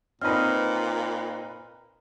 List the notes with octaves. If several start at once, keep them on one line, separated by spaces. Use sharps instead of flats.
A#2 C4 D#4 B4 A#5 F6